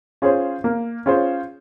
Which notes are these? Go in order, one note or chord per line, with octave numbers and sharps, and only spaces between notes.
C#4 F4 G#4 C5
A#3
C#4 F4 G#4 C5